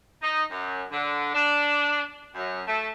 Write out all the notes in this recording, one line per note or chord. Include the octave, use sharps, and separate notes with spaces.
D#4
F#2
D3
D4
F#2
A3